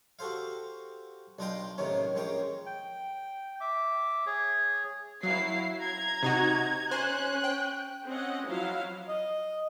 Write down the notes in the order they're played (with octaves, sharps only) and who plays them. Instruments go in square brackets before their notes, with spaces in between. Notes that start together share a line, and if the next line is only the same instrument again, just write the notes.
[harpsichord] F#4 G4 A4 C5 F5
B1 D4 F4 D#5 G5 C6
A2 C3 D#3 A#3 C4 C#4
A#1 G#3 A#3 C#4 G5
[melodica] G5
E5 D6
G#4 C#5
[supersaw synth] F#3 [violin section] E4 F5 C7
[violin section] A#5 G#6
[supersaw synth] C3 D#4 F#4
[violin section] C#4 F#6 [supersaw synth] C5 G#5
[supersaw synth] G5
[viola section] C4 C#4 D#5 F#5
F3 F#3 E4 F5
[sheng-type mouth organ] D#5